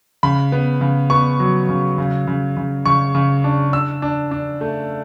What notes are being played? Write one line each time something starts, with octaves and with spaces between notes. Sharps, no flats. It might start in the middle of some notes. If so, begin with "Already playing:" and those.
C#3 B5
B3
C#3
B3 C#6
F#3
C#3
C#3
C#3
C#3
C#3 C#6
C#3
D4
D4 E6
D4
D4
A3